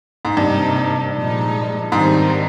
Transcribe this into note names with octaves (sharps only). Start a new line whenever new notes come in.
G#2
G2 C3 G3 A#3 D#4
A#2 F3 G#3 D#4
G#2 D#3 G3 C4 D#4